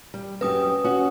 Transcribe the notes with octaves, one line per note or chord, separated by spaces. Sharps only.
G3
F#2 G4 B4 D#6
C#4 F#4